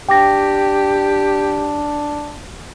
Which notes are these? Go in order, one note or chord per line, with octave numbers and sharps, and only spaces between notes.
D4 G4 G5 D6 A#6